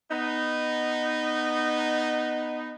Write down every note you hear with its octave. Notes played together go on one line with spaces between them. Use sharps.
B3 D#4